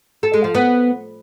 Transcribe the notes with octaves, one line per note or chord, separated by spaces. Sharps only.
A4
G#3
F3
B3